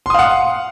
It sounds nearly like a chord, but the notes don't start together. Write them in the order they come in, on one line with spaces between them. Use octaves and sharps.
C6 D#6 F5 F#5